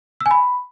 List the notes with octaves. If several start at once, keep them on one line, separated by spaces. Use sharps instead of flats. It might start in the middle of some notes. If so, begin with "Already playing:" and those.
E6
G#5
B5